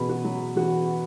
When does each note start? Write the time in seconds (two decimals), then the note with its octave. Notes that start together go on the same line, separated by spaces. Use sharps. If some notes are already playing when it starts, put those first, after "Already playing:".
Already playing: E2 B2 G#4 B4
0.09 F#4
0.25 F#3
0.56 E2 F#4